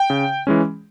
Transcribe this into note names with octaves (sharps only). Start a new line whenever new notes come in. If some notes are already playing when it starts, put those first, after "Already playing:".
Already playing: G5
C#3
E3 G#3 C#4